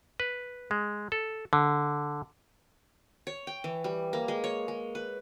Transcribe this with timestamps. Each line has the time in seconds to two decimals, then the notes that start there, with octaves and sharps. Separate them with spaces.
0.20 B4
0.71 G#3
1.12 A4
1.53 D3
3.27 C#5
3.47 G5
3.64 E3
3.84 G3
4.13 A#3
4.28 G#3
4.44 C#5
4.68 G#3
4.95 B4